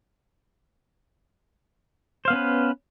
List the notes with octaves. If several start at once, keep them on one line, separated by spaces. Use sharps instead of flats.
B3 C#4 B4 C5 F5